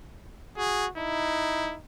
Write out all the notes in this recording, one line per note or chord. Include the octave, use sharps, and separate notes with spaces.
F#4 G#4
D#4 E4